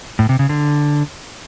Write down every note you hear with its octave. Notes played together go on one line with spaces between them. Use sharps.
A2
C3
C#3
D3